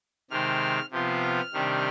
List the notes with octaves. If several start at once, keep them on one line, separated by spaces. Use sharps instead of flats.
C3 D#3 G#3 C4 F6
C3 F3 B3 F4
F6
C3 D#3 G3 D4